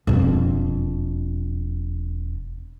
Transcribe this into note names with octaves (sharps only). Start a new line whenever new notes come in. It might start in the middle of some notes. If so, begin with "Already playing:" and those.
E1 F2